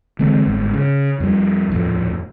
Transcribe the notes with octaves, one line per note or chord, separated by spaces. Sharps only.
D3 E3 G#3 C4
G1 G#2
C#3
F2 G3
D#1 F2 A2